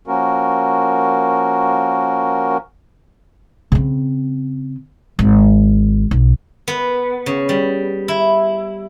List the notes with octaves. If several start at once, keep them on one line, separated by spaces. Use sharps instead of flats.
F3 A#3 C#4 F#4 A#4
C#3 C4
G#1
B1
B3
C#3
G3
E4